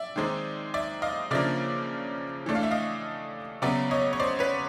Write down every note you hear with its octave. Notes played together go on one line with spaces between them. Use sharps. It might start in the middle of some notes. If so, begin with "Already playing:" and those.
Already playing: D5 E5
D#3 G#3 C4 D#4
D5 E5
D#5 F5
C#3 F3 A#3 D4 D5 E5
E3 A3 D4
F5
E5
D#5 F5
C#3 F#3 B3 D5 E5
C#5 D#5
C#5
C5 D5
B4 C#5